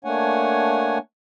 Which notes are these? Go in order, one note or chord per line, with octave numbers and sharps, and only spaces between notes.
A3 A#3 D4 C#5 F#5 G#5